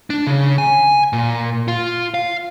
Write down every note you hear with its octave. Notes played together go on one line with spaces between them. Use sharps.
D4
C#3
G#5
A#2
F4
F5